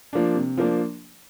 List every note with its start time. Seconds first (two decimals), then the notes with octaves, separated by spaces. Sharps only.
0.13 F3 A#3 D4
0.35 C3
0.57 F3 A#3 D4